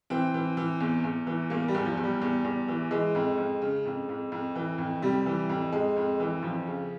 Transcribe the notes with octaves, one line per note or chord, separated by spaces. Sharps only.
E3 C4
E3
E3
E2
E2
E3
E2 A#3
G3
E2
F3
E2
G3
E2
E2
E3
E3 G#3
F2
F2
C#3
F2
F2
F2
E3
F2
C3 G3
E3
F2
F2 G#3
F2
E3
F2 F3
C#3